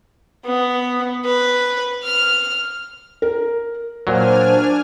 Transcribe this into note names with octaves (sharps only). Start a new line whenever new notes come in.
B3
B4
F6
A#4
A#2 F#3 D4 C5 G#5 F6